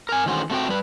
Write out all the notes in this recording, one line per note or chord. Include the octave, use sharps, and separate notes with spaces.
A#4 G#5
D#3 E3 A3 C#4 F#4 C5
A3 C4 F#4 G5
G3 B4